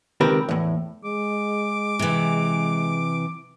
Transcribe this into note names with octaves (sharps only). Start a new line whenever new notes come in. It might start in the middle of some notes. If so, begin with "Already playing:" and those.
C#2 D#3 C4 G4 A#4 B4
E2 A2
G#3 D6
C3 E3